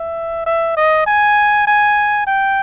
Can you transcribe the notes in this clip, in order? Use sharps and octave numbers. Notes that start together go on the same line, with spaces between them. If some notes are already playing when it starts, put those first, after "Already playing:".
Already playing: E5
E5
D#5
G#5
G#5
G5